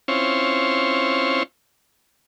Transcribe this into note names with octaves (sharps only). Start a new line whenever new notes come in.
C4 C#4 E4 F4 C5 C#5